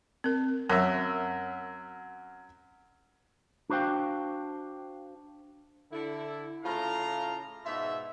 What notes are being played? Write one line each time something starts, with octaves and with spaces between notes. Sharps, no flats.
C4 A#4
F#2 A#4 E5
D4 F#4 C5 F5 G5
D3 E4
A2 C#3 A3 F4 F5 A#5
G#2 B2 F4 E5